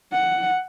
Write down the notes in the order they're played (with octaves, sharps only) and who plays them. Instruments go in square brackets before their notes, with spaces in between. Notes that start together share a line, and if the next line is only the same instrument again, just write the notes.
[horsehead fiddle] F#5